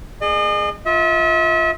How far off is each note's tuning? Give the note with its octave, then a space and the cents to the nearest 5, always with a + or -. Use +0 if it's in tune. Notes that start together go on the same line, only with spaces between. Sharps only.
A#3 +0 G#4 +0 D#5 -40
F4 +0 E5 -40